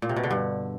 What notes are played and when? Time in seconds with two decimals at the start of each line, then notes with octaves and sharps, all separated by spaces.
0.02 A#2
0.09 C3
0.16 B2
0.23 D3
0.31 G2